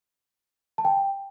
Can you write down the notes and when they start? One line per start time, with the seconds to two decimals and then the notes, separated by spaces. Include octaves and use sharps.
0.78 A5
0.85 G5